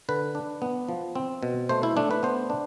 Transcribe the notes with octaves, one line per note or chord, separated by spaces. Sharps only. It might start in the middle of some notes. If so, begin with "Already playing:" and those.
D3 B4
D4
B3
F3
C4
B2
A3 C5
E4
A3 D4
B4
B3 C5
D4